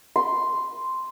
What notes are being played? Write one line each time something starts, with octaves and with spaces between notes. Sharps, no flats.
C6